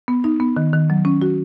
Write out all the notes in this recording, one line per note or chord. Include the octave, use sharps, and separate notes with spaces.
B3
D#4
B3
D#3
D#3
F#3
C#4
F#4